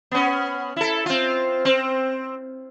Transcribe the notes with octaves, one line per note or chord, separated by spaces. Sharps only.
B3 C#4
E4 A4
C4 F4
C4